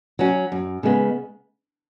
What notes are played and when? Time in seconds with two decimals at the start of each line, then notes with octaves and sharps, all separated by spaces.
0.19 F#3 C#4 F#4
0.52 F#2
0.83 C#3 G#3 B3